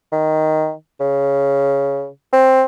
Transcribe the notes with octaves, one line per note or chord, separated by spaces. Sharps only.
D#3
C#3
C4